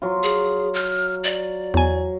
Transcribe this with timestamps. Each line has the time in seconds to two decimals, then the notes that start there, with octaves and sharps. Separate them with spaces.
0.02 F#3 F4
0.23 G#4
0.74 F6
1.24 D5
1.74 E2 F#3 G#5